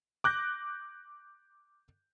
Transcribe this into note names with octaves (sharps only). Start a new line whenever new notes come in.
D6 F#6 G6 A#6